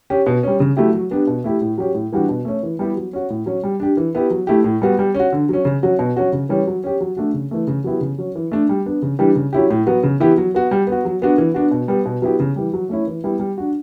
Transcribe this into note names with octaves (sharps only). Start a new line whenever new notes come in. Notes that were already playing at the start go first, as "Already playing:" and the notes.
C#4 G4
B2
G3 C#4
C#3
F#3 A3 E4 G4
F#3
B3 D4 G4
B2
A3 E4 G4
A2
F#3 C#4 G4
A2
E3 G3 D4 F#4
B2
A3 C#4
E3
G3 B3 E4 G4
F#3
C#4 F#4
A2
F#3 C#4
G3
D4 G4
E3
B3 E4 G4
F#3
A3 E4 G4
A2
G3 B3 F#4
G3
C#4
F#4
D3
F#3 C#4
C#3
F#3 C#4 F#4
B2
F#3 C#4 F#4
C#3
E3 G3 C#4
F#3
C#4 G4
F#3
A3 D4 F#4
C#3
E3 A3
C#3
F#3 B3 E4 G4
C#3
F#3 C#4
E3
A3 D4
G3
B3 D4
C#3
E3 G3 D4 G4
C#3
F#3 C#4 E4 G4
A2
F#3 B3 F#4
C#3
E3 B3 E4 G4
F#3
B3 F#4
G3
B3
F#4
F#3
B3 D4 F#4
E3
B3 D4 F#4
B2
G3 B3
B2
F#3 B3 E4 G4
C#3
E3 G3
F#3
A3 C#4 E4
E3
G3 B3 E4
G3
D4 F#4